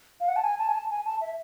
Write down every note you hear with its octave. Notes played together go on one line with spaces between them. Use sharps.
F5
F#5
A5
G#5
A5
G#5
A5
G#5
A5
E5